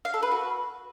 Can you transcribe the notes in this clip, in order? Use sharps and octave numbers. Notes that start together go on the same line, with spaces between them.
F5
A4
B4
F#4